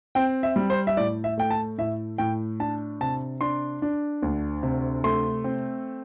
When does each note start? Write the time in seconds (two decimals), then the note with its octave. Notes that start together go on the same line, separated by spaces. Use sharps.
0.15 C4 G5
0.43 E5
0.56 G3
0.70 C5
0.87 E5
0.97 A2 D5
1.24 E5
1.38 A3 G5
1.51 A5
1.78 A2 E5
2.18 A2 G5
2.60 D4 A5
3.01 C3 A5
3.41 D4 C6
3.82 D4
4.22 D2
4.63 C3
5.04 A3 C6
5.44 C4